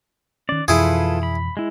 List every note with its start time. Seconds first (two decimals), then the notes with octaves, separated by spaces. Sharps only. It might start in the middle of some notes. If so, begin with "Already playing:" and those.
0.49 D#3 C#4 D5
0.68 F2 B2 E3 E4 F4 G#4 A4 B4
1.23 B5
1.57 G#3 E4